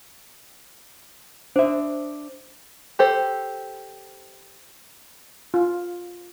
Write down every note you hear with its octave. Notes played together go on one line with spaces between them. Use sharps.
D4 C5 E5
G4 A4 C5
F4